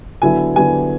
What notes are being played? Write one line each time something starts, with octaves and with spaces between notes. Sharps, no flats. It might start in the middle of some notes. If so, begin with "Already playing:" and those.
D3 F#3 B3 E4 G#5
D3 F#3 B3 E4 G#5